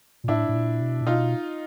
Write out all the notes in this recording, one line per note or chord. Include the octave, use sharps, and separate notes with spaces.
A#2
A2 D4 E4
A2
A#2
B2
A#2
B2 D#4 F4